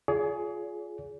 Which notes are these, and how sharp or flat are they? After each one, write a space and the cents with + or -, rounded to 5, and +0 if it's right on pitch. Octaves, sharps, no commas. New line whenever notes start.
F4 +0 G#4 +15 D5 -45